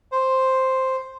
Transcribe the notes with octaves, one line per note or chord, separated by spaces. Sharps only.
C5